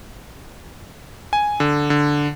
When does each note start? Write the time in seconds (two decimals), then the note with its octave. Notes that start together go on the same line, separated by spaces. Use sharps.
1.33 G#5
1.60 D3
1.90 D3